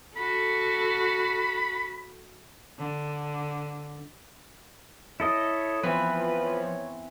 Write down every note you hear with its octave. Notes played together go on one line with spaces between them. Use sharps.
F#4 A4 B5
D3
E4 A4 C#5 D#5
E3 F3 B3 C4 B4
C#5